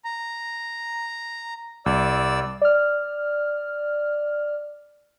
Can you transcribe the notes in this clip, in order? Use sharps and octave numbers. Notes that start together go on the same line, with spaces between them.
A#5
C2 D5 E6
D5 F6